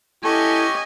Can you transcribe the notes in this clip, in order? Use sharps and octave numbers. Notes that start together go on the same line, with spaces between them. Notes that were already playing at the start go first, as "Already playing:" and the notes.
C#4 E4 G4 A4 D#5 G#5 C#6